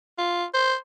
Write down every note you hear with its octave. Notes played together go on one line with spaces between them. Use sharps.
F4
C5